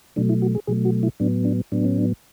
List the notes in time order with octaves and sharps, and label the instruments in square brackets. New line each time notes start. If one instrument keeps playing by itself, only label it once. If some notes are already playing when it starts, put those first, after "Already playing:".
[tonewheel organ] B2 F#3 A3 D4
E4
F#4
G#4
B2 F#3 A3 G#4
F#4
E4
A2 F#3 B3 D4
D4
A2 F#3 B3 D4
C#4
D4